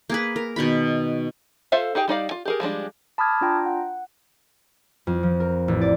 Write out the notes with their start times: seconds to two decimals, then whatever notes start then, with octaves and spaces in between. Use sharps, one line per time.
0.10 A#3 G#4 B4
0.36 A#4
0.56 B2 D#3 F#4 B5
1.72 F4 A4 C5 E5 F5
1.95 D#4 G4 G#4 G5
2.08 G3 D#4 D5 F5
2.31 F4
2.45 G4 G#4 A#4
2.60 F3 G3 G#3 D4
3.18 A5 B5 D6 D#6 F6 G#6
3.41 D4 F4 G5 A#5
3.66 F#5
5.07 F2
5.23 F3
5.40 A#4
5.68 A1
5.81 D5